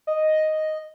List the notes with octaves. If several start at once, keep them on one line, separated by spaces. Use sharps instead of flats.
D#5